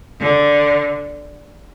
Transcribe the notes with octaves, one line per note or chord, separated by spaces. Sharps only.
D3